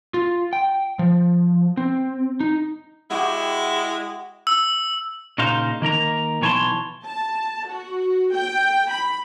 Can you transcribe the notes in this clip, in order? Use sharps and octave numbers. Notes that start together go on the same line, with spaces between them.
F4
G5
F3
C4
D#4
G#3 E4 F#4 G4
E6
A#2 C#3 D#4 C5 F5
D#3 A#3 A#4 A#5
B1 E3 C#5 G#5 A5 C6
A5
F#4
G5
B5